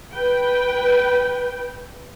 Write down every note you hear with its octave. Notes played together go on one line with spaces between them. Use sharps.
B4 G5